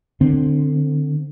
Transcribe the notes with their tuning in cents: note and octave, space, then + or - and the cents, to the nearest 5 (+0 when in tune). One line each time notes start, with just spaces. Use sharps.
D3 +20 C4 +0